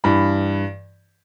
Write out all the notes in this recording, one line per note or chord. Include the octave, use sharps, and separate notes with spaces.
G2 E3 B5